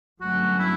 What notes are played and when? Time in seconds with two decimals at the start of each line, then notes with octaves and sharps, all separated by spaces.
0.20 G1 G2 F#3 A3 C#4 F#4
0.59 E4